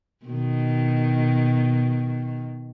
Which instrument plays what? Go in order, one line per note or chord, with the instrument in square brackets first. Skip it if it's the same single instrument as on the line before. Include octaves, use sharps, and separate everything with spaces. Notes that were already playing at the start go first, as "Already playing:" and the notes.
[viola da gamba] B2 D#3